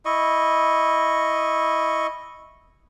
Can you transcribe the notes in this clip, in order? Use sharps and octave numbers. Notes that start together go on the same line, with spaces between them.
E4 D#5 C#6